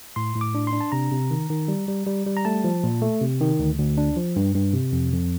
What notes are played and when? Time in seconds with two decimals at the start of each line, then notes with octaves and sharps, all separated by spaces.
0.16 A2 C6
0.35 A2
0.41 D6
0.55 D4
0.67 C6
0.73 D4
0.81 A5
0.92 C3 A#5
1.12 C3
1.31 D#3
1.50 D#3
1.68 G3
1.88 G3
2.06 G3
2.26 G3
2.37 A#5
2.45 A3 A5
2.64 F3
2.84 A#2
3.02 A3
3.21 C3
3.40 D#3
3.59 D2
3.79 D2
3.98 D4
4.16 F3
4.36 G2
4.55 G2
4.73 C3
4.92 F2
5.13 F2